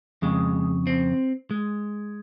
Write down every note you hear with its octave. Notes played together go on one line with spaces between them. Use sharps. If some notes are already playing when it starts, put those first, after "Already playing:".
F2 C#3 G#3
C4
G#3